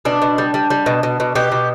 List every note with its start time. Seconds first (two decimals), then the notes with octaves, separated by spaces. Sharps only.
0.05 B2 D4
0.22 B2
0.38 G3
0.54 G3
0.70 G3
0.86 B2
1.03 B2
1.20 B2
1.35 B2 G4
1.52 B2